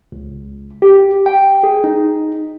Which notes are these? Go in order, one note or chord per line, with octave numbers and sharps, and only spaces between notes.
C#2
G4
G5
G#4
D#4